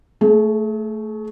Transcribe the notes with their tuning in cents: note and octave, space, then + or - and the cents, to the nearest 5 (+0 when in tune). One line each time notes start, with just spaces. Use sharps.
A3 +5 G#4 +40